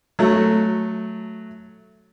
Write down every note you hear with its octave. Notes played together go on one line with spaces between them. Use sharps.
F#3 A3